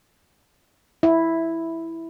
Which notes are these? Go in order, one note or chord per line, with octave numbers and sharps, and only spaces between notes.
E4